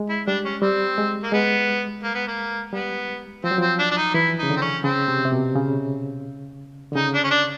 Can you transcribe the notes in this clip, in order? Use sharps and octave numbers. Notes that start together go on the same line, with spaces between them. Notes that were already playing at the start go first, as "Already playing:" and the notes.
Already playing: G#3
E4
G3 D4
C#4
G3 C4
G#3
A#3
G#3 B3
A#3
B3
A#3
G3 B3
F3 C4
F#3
F3 C4
D4
D4
D#4
E3 E4
C#3 D#4
D3
C4
C#4
C#3 C4
C3
C3
B2
C#3
D3
C#3 D#4
D4
C#4
D4